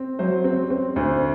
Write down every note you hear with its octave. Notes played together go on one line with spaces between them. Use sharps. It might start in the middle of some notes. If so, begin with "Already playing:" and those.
Already playing: C4
F#3 C5
C4
C4
D2 C5